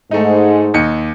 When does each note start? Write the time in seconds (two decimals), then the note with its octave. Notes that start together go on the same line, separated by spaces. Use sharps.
0.11 G#2 A3 D#4
0.74 D#2 D#5 C#7